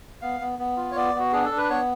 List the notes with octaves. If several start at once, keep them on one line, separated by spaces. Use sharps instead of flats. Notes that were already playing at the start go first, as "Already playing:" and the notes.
B3 F5
B3
B3
F4
C#5
B3 D5
B3 F#4
D4 G#4
A4
D4
B4
B3 C#5